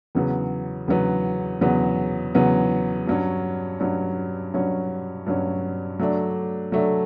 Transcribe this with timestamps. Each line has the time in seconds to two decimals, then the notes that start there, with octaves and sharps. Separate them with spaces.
0.15 E2 C#3 F#3 B3
0.88 E2 C#3 F#3 B3
1.61 E2 C#3 F#3 B3
2.35 E2 C#3 F#3 B3
3.07 G2 F#3 C#4
3.80 G2 F#3 C#4
4.54 G2 F#3 C#4
5.26 G2 F#3 C#4
5.99 F#3 A3 D4
6.72 F#3 A3 D4